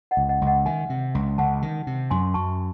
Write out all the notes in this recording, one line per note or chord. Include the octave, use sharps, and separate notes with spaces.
D#5 F#5
C#2
D#5 F#5
C#2
D#5 F#5
D#3 E5 G#5
C3
C#2
C#2 F#5 A5
D#3
C3
F#2 G#5 C6
F#2 A5 C#6